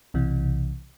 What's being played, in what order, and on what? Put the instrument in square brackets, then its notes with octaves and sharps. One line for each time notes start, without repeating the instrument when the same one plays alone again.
[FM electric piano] B1 C3 E3